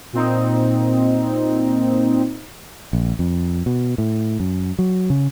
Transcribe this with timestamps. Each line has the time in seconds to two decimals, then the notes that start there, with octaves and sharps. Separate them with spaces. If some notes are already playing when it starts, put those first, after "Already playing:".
0.13 A#2 C4 D#4
2.93 A#1
3.19 F2
3.66 B2
3.98 A2
4.40 F#2
4.79 F#3
5.10 C#3